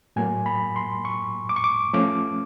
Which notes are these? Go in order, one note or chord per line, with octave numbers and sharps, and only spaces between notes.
A2 F#3 A#3 G#5
B5
C6
C#6
D6
C#6
D6
F3 A3 C#4 D6